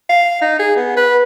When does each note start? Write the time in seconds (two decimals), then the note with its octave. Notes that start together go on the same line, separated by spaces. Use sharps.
0.09 F5
0.42 D#4
0.59 G#4
0.77 B3
0.96 B4